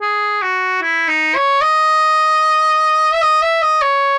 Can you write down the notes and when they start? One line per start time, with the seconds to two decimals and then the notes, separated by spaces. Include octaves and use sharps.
0.02 G#4
0.42 F#4
0.82 E4
1.08 D#4
1.36 C#5
1.61 D#5
3.14 E5
3.22 D#5
3.42 E5
3.62 D#5
3.82 C#5